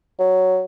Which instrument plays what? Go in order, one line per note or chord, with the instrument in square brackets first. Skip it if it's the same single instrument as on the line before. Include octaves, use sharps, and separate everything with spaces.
[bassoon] F#3